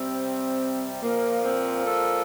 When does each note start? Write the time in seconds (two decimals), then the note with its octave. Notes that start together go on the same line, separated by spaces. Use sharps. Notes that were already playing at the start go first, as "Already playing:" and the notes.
Already playing: C3 G3 C4
1.02 A#2 F3 A#3
1.44 C4
1.86 A4